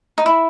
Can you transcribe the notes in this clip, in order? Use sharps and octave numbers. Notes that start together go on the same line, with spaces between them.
D#4
E4